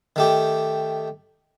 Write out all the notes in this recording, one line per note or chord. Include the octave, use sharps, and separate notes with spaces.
D#3 A3 G4